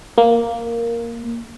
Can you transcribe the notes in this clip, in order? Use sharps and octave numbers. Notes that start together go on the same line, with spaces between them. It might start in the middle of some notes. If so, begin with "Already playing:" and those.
A#3